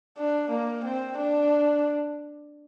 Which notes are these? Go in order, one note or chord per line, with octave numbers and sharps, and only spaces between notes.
D4
A#3
C4
D4